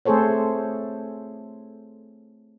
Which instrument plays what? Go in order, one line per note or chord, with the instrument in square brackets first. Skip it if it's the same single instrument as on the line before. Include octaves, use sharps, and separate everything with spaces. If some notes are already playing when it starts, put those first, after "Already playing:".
[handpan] A3 C4 G#4 A4 C5 C#5